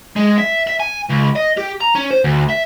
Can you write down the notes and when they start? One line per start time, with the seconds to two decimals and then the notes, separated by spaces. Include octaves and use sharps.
0.16 G#3
0.38 E5
0.67 E5
0.80 G#5
1.10 C#2
1.36 D#5
1.58 G4
1.81 A#5
1.95 C#4
2.10 C5
2.24 D2
2.50 E5